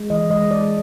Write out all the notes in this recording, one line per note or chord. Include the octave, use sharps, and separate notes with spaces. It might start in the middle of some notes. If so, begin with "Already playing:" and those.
Already playing: G#3
E3 D#5
G#3 D#5
G#3 D5